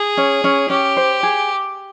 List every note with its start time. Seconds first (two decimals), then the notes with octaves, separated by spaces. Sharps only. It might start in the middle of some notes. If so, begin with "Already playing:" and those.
Already playing: G#4
0.17 C#4
0.44 C#4
0.70 C#4 G4
0.97 C5
1.23 G#4